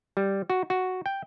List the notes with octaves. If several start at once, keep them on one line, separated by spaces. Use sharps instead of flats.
G3
F#4
F#4
G5